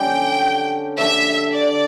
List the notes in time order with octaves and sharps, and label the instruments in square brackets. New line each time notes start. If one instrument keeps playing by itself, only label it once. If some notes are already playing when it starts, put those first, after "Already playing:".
Already playing: [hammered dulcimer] D3 G3 C#4 [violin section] G5
[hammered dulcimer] D3 G3 D4 A4 [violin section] E5
[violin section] D5